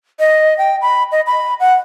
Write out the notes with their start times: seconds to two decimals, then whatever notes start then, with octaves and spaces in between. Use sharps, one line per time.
0.20 D#5
0.58 G5
0.82 B5
1.12 D#5
1.27 B5
1.60 F#5